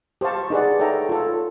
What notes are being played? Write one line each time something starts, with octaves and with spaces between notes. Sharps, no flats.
G4 C5 F5 A5 C#6
D#4 G#4 B4 D5 F#5
A4 C#5 E5 G5 A#5
F4 A4 C#5